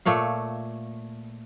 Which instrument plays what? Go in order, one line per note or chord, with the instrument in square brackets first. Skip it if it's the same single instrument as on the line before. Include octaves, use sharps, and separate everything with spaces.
[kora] A#2 A3 C#5 F5